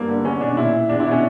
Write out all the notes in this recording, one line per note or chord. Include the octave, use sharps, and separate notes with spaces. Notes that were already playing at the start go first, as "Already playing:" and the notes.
Already playing: G2 A#3
D3
E2 C#4
B2 D4
A#2 E4
E2 D4
E4
B2 D4
C#4